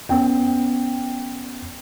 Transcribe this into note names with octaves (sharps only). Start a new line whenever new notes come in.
B3 C#4 G5